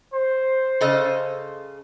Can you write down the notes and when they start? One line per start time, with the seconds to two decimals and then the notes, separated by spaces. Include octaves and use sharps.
0.13 C5
0.81 C#3 A4 D#5